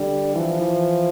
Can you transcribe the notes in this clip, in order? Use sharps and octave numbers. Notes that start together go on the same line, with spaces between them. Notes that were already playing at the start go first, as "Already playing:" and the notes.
Already playing: D3 G3
E3 F3
E3